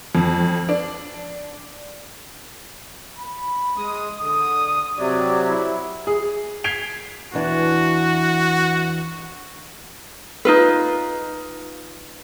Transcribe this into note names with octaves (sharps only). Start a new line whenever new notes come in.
F2
D4
B5
G#3 D#6
D3 D#6
C3 F#3 D5
E4
G#4
G#6 B6 C7 D7 F7 G7
E2 E3 D4 F#4
D#4 F4 B4